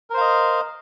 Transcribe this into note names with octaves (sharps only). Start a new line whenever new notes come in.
A#4 C5 D#5 F5